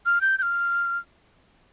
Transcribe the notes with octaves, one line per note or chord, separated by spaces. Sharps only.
F6
G6
G6
F6